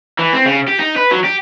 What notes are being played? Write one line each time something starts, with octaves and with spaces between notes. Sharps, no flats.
E3
C4
C#3
G4
D#4
B4
F#3
G4